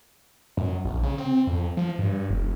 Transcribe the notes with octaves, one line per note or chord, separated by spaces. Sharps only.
F#2
A#1
C#3
C4
F2
F3
G2
F1